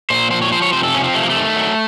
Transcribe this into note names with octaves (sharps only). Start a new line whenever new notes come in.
A#2 C5
F3 C5
C#5
F3 C5
C#5
C3 C5
A4
F3 C#4
C4
C3 A3
A#3
A3
D#3
F#3